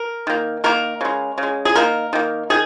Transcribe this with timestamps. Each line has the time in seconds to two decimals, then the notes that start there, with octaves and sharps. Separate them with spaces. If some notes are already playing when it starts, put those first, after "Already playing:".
Already playing: A#4
0.27 D#3 A#3
0.64 D#3 A#3 A#4
1.01 C#3 G#3
1.38 C#3
1.43 G#3
1.65 G#4
1.75 D#3 A#3 A#4
2.13 D#3 A#3
2.50 D#3 G#4